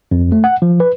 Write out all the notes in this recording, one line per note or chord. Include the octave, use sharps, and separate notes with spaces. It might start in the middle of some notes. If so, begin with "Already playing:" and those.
F2
A3
F#5
F3
B4